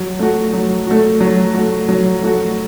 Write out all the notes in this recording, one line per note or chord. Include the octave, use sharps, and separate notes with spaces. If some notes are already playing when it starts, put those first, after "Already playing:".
Already playing: F#3
A3 F#4
F#3
A3 F#4
F#3
A3 F#4
F#3
A3 F#4